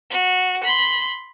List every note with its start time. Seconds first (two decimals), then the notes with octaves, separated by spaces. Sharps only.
0.10 F#4
0.64 B5 C6